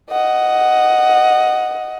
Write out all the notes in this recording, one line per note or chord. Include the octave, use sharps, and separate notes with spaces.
D#5 F#5